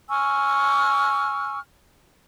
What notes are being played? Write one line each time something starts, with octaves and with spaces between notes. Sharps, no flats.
G#5 C#6 E6 F6